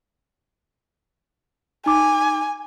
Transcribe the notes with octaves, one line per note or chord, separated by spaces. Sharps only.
D#4 G#5 D6